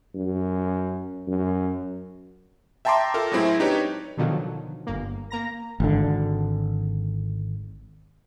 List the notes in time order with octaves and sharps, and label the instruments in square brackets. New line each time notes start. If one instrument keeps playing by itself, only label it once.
[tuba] F#2
F#2
[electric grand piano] E5 G5 A5 A#5 C6 D6
F4 A4 A#4
A2 F#3 G#3 C4 E4
D4 D#4 G4 B4 C#5
[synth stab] B2 D3 D#3 F3 F#3
G1 A#3
A#3 A#5 A#6
[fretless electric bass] G#1 D3